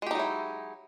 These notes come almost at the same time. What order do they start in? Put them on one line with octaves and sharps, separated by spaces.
G#3 G4 D#4 F#3 E4